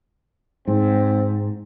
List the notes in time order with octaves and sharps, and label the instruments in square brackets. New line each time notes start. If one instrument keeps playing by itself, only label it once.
[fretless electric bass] G#2 [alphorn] C4